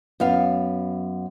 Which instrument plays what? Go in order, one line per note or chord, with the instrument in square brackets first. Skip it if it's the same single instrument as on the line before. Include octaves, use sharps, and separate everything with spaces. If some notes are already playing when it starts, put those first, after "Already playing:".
[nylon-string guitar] F#2 B3 F5